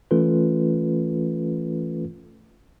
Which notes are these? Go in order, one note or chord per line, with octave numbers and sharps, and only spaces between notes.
E3 A3 C#4 F4 A4 B4